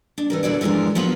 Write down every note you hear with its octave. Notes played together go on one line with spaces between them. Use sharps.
D4
E3 G3 A#4
E2 B2 D3 F#4 C#5 D5
E3 F3 G#3 D4 A#4
F3 F#3 B3 F4 F#4 A#4